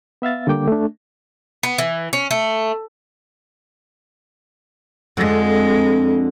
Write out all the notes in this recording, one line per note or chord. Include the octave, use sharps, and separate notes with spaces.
B3 E5 F5 A6
D3 G3 A#3 G5 D6
A3 D4
B3
E3
C#4
A3
F2 D3 G#3